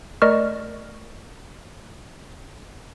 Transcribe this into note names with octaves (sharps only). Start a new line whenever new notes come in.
A3 A#4 D5 D#5 C#6 F6